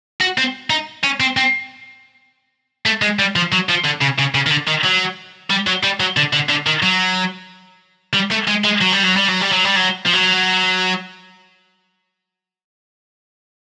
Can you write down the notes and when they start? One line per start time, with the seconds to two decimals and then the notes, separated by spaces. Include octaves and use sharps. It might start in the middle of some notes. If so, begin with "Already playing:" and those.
0.21 F#4
0.38 C4
0.70 D#4
1.04 C#4
1.20 C4
1.37 C4
2.86 A3
3.02 G#3
3.19 G3
3.36 F3
3.52 F#3
3.69 F3
3.84 D3
4.01 C#3
4.18 C#3
4.35 C#3
4.46 D#3
4.50 D3
4.68 D#3
4.84 F#3
5.50 G3
5.67 F#3
5.83 G3
6.00 F#3
6.17 D3
6.33 D3
6.49 D3
6.66 D#3
6.82 F#3
8.14 G3
8.31 A3
8.48 G#3
8.65 G#3
8.81 F#3
8.93 G3
9.04 F#3
9.16 G3
9.28 F#3
9.41 G3
9.52 F#3
9.64 G3
9.75 F#3
10.06 F3
10.13 F#3